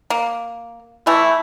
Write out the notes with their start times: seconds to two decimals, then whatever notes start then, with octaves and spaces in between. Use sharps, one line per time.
0.10 A#3
1.07 E3 A3 E4